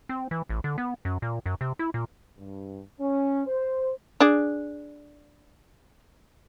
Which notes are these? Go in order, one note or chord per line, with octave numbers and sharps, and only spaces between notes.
C4
E3
A1
D3
B3
F#2
A#2
F#2
C3
E4
A#2
G2
C#4
C5
D4 G#4